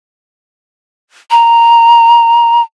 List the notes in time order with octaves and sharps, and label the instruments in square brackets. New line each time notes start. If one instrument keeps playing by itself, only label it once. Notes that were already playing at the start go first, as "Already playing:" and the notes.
[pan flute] A#5